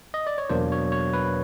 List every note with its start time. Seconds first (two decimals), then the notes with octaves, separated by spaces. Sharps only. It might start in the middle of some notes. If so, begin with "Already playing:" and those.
0.14 D#5
0.27 D5
0.38 C#5
0.49 E2 B2 F#3 A#3 D4 C5
0.72 C#5
0.92 C#5
1.13 B4